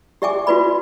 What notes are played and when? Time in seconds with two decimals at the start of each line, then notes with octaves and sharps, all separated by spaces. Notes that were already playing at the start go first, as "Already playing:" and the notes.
0.22 G4 D5 E5 G5 G#5 D6
0.47 F4 F#4 B4 D5 B5